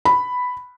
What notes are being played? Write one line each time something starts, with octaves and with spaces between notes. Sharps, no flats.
B5